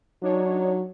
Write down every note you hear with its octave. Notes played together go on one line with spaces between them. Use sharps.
F#3 D4 D#4 C#5